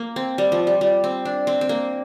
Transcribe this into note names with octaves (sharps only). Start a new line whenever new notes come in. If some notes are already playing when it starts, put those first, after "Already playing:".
Already playing: A#3
C4
G3
F3
G3
G3
C4
D4
C4
C4
A#3